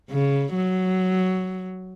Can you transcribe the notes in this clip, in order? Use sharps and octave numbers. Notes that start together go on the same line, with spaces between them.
C#3
F#3